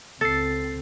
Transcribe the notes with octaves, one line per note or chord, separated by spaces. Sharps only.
C#2 C4 A4 A6 C7